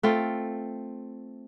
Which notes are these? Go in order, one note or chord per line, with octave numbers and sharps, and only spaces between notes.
A3 C4 F4